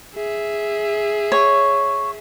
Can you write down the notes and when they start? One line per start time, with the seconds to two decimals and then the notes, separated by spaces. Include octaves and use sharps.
0.15 G#4 E5
1.32 C#5